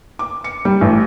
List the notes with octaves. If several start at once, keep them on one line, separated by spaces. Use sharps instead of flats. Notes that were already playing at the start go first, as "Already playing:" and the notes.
D6
C#7
G3
A1